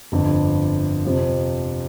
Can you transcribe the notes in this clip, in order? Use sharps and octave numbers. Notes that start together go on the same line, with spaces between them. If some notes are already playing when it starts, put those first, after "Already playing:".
G1 F2 D3
F2 C3 F3 C4 F4